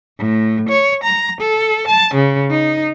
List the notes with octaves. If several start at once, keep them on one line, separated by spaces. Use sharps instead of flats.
A2
C#5
A#5
A4
A5
C#3
D#4